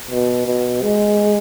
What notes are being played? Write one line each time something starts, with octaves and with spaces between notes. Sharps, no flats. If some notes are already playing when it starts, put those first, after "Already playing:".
B2
B2
G#3